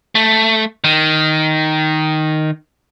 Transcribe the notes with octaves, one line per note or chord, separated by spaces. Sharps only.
A3
D#3